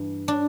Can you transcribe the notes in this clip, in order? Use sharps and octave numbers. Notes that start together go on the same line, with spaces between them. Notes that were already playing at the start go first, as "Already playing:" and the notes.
Already playing: G2 E3
D4